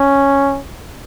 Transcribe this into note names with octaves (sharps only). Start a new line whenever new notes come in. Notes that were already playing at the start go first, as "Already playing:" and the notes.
Already playing: C#4